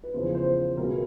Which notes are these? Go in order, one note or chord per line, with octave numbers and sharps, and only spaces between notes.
B4
E2 C#3 F3 C5
C5
C5
B1 B2 G#3 B3 A#4